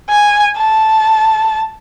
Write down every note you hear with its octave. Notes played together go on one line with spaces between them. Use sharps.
G#5
A5